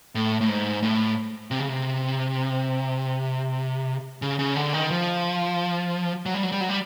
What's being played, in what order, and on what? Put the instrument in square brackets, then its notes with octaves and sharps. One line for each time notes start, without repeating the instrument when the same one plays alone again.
[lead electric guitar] A2
A2
G#2
A2
C3
C#3
C3
C#3
C#3
D3
D#3
F3
F#3
G3
F#3
G3
F#3
G3